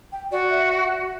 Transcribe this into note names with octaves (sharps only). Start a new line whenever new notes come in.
G5
F#4 D5
E5